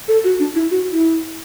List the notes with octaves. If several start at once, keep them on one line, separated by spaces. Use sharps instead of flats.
A4
F#4
D4
E4
F#4
E4